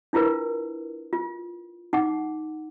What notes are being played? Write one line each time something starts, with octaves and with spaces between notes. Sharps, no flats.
D4 E4 F4 A#4 B4
F4
D#4 F#5 D6